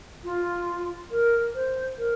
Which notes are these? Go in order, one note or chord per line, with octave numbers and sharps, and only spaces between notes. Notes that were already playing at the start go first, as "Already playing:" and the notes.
F4
A#4
C5
A#4